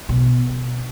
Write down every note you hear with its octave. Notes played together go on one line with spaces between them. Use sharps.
B2